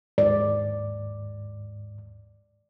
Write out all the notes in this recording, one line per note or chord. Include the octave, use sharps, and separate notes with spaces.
D#2 G#2 D5